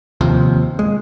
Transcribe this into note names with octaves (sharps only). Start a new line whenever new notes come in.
D#2 C3 F3
G#3